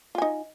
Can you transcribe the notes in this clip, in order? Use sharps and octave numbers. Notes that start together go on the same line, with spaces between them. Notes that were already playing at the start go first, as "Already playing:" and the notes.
D#4 F4 G#5